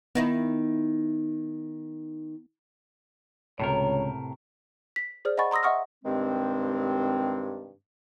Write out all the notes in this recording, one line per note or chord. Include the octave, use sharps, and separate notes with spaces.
D#3 B3 D#4 E4
C#2 A2 C3 A#4 C#5
B6
G#4 C5 D5 F6
D#5 F#5 G#5 B5 C#6 A6
A#5 C6 D#6 E6 A#6
D#5 E5 F#5 C#6 D#6 F6
G2 C3 D#3 G#3 C4